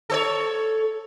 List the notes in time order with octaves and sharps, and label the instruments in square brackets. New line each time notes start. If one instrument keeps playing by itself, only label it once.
[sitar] A4 C5 C#5